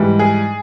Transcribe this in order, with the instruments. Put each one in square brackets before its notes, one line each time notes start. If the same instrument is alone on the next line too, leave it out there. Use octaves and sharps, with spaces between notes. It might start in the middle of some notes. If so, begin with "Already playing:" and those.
Already playing: [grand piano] G#2 E3 G3
G#4